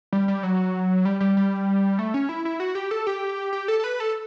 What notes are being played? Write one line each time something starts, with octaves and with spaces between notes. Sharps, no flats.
G3
G3
F#3
G3
G3
G3
A3
C#4
E4
E4
F#4
G4
A4
G4
G4
A4
A4
B4
A4